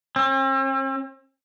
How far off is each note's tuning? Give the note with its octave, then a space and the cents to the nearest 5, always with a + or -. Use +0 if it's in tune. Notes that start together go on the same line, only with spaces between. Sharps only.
C4 +45